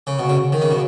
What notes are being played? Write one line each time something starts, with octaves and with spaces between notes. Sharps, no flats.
C#3
B2
C#3
D#3
C#3
B2